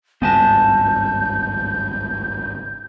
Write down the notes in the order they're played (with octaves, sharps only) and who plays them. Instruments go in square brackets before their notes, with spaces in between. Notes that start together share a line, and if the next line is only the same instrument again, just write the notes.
[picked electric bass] G#1 C#2 G2 [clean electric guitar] B3 G#5 A5 [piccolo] G6